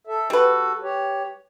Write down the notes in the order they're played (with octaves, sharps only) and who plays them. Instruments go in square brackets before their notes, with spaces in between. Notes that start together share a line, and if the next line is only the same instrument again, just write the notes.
[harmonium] A4 E5
[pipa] G3 B4 [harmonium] F#4 A4
[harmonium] G4 C#5